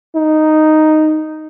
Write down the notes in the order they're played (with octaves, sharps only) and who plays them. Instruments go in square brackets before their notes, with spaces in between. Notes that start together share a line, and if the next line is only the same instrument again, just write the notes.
[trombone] D#4